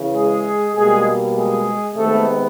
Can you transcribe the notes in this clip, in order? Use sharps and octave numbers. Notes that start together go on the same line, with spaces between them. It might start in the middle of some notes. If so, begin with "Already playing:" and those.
Already playing: C#3 E3
G#3 G#4
B2 G3 G#3 A#3 G#4
G#3 G#4
C3 D#3 G#3 A3 B3 A4